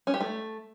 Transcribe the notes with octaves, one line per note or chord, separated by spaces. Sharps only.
C#4
G4
A3